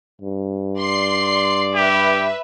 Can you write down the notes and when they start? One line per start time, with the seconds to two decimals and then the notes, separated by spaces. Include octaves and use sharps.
0.22 G2
0.79 D5 C6 C7
1.75 G4 B4 E5